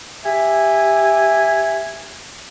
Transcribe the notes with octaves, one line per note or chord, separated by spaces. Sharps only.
G4 E5 G#5